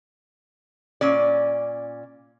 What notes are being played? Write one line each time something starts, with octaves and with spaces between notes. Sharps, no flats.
A#2 C#4 D5